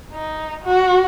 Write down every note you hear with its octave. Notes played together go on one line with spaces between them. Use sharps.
D#4
F#4